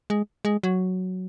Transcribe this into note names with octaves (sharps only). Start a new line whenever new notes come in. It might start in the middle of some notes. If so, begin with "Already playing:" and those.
G#3
G#3
F#3